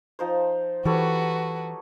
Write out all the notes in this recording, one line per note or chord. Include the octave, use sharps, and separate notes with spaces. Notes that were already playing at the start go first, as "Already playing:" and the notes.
F3 D#4 C5
E3 G3 F#4 A4 B4 C#5